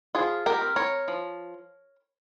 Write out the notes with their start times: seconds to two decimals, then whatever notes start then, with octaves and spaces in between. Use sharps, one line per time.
0.15 F3 F4 G#4
0.46 G4 A#4
0.61 C4
0.76 A#4 C#5
1.08 F3